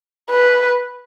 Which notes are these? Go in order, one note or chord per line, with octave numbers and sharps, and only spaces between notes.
B4